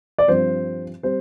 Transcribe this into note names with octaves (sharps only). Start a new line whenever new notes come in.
D5
G2 F3 C4 C5
G3 C4 C5